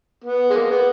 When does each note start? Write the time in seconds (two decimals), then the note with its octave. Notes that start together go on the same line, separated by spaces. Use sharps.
0.24 B3
0.50 G#3
0.54 A#3
0.70 B3